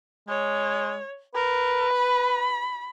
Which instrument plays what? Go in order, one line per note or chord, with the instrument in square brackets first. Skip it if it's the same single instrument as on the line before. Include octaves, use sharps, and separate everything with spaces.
[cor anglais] G#3 [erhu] C#5
[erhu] A#4 [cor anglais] B4
[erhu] B5